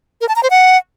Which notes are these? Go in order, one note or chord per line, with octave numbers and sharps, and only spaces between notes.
A#4
A5
A#5
C5
F#5